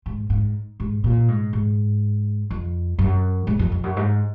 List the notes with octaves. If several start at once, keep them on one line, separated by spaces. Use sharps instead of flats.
G#2
G#2
G#2
A#2
G#2
G#2
F2
F#2
G#2
F2
F2
F#2
G#2